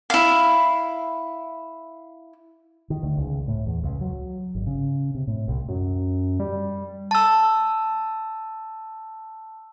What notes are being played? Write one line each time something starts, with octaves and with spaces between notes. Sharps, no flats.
E4 F5
D#3
D2
C#2
A2
E2
C#2
F#3
G#1
C#3
C3
A2
C2
F#2
G3
A5 E6